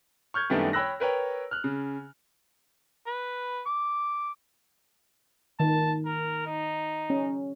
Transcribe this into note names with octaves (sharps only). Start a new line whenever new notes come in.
C#6 F6 G6 G#6
F#2 D#3 G3 A3 B3 D4
C#5 G5 B5 E6 F#6 A#6
A#4 B4 C#5 G5
F6 F#6
C#3
B4
D6
D#3 A5
A#4
D#4
C#4